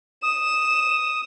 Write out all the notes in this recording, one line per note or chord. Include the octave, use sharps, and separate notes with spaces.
D#6 E7